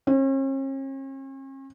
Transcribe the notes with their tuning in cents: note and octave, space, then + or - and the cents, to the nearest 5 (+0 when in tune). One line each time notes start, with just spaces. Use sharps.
C#4 -45